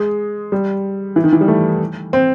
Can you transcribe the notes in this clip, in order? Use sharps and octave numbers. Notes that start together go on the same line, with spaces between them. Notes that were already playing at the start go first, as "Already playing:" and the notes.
Already playing: G#3
G3
E3
D#3
E3
G3
A3
C4